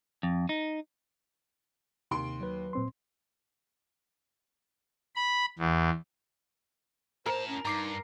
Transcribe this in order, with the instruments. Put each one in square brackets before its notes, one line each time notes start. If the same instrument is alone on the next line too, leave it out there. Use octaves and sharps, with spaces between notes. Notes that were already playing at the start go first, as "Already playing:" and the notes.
[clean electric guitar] F2
D#4
[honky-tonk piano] D#2 C6 D7 [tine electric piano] C3
[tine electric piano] F#3 B4
[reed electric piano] A#2 C4 C6
[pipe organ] B5
E2
[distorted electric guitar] A2 A5 [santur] A#4 [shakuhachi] C5
[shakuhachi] C#4
[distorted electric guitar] G2 [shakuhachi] D#4 [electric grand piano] A#5 D6 C7